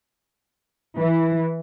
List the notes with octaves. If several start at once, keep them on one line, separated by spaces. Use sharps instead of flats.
E3